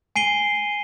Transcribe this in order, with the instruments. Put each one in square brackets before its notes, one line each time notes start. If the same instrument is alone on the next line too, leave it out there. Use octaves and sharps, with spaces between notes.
[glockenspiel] G#5 C7 D#7 G7